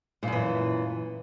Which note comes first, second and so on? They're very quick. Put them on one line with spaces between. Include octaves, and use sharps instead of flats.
A#2 F#2 E3